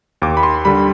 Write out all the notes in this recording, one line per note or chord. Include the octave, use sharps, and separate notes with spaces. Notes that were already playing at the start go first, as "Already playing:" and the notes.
D#2 D6
B5
C6
D3 G3 B5